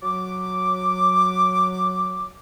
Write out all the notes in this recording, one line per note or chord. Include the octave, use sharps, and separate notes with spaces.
F#3 D6